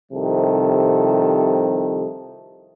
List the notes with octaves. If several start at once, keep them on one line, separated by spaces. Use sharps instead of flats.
C2 C3 D#3 F3 A4